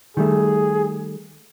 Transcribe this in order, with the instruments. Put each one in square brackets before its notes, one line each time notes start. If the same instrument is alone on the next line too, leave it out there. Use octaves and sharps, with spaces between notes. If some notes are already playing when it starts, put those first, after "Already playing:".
[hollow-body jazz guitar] D#3 G3 A3 [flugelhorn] G#4